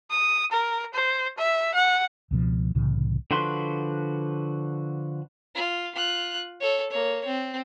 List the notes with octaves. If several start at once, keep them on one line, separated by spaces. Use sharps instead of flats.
D#6
A#4
C5
E5
F#5
C#2 B2 F3
C2 A2 C#3 E3
D3 F3 F#4 B4 C6
F4
F4 F#6
A4 C#5
A#3 C#5
C4